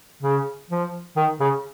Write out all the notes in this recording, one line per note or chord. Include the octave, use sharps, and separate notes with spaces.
C#3
F3
D#3
C#3